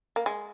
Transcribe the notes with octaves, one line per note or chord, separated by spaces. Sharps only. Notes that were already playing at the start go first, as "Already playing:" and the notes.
A#3
G#3